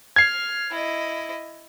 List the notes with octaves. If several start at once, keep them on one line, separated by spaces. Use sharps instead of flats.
F6 G#6 C7
E4 D#5